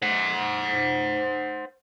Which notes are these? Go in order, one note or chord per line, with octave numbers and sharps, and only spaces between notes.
C5 F#5